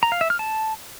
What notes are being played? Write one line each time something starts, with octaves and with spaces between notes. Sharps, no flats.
A#5
F5
E5
F6
A5